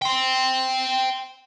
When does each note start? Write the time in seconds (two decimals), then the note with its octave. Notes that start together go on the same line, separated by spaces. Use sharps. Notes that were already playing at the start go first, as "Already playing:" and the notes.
0.02 G5 C6